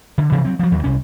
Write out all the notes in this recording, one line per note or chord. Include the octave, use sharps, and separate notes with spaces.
D3
C3 E3 F3 C4
F#3 C4
F3 F#3
D#2 F#3
C2 C#4